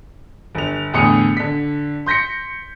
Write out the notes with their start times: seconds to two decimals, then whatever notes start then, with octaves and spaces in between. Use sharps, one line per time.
0.55 G1 F7
0.93 E2 A2 D3 D#6 C#7
1.37 D3 B6
2.06 C6 G6 A#6 B6 C#7